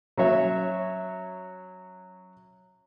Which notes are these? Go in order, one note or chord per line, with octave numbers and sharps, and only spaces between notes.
F#3 C#4 C#5 E5